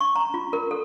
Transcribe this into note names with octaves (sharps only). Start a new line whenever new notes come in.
C#6
A#5
F4
A#4
A4